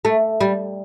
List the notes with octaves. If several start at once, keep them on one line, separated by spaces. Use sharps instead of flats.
A3
G3